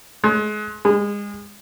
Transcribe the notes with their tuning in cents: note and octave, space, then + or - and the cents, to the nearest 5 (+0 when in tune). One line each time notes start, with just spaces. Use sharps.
G#3 +30
G#3 -25